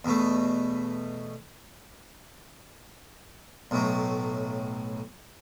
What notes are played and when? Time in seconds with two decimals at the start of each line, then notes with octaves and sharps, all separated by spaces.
0.05 E2 B2 A3
3.71 B1 A2 F#3